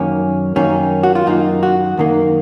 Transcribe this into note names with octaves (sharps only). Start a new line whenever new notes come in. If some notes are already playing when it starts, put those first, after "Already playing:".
Already playing: F#2 D#3 A#3 C#4
F#2 D#3 A#3 C#4
F#4
F4
F#2 D#3 A#3 D#4
F#4
F#2 D#3 A#3